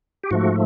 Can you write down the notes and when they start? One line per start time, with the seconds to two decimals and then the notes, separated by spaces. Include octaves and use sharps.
0.23 G4
0.31 G#2 F3 A3 F#4